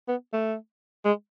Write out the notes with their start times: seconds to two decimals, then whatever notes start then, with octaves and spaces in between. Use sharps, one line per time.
0.08 B3
0.33 A3
1.05 G#3